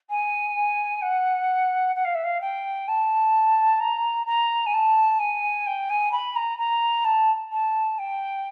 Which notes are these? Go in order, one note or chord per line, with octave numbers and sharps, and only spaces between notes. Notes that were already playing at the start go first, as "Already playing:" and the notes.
G#5
F#5
F#5
F5
E5
F5
G5
A5
A#5
A#5
G#5
A5
G#5
G5
G#5
B5
A#5
A#5
A5
A5
G5